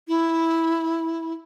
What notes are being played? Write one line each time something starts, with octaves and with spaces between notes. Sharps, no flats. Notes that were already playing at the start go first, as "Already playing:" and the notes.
E4